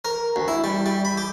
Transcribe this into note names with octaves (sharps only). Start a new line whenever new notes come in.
A#4
D2
E4
G3
G3
B5
G4